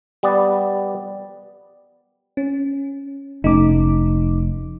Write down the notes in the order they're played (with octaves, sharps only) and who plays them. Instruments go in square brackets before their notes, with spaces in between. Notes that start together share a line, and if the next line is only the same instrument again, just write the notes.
[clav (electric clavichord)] G3 B3 D5
[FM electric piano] C#4
[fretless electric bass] F1 A3 C#4 [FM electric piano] D#4 D6